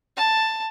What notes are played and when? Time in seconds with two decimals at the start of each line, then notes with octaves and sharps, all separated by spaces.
0.17 A5